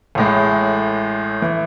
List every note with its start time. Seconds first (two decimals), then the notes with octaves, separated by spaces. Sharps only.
0.15 A1 A2 G#3
1.42 E3